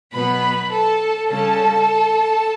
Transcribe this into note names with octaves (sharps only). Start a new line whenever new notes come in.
B2 F#3 B3 B4 B5
A4 A5
C#3 G3 C#4 A4 A5